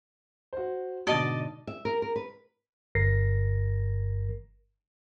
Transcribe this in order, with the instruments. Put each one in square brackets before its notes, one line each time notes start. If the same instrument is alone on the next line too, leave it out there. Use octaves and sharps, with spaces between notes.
[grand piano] F#4 C5
[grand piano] G#2 B2 D3 [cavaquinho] D5 D#5 A5
[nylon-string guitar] E5
A#4
A#4
B4
[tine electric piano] G1 G2 A#4 A#6 C7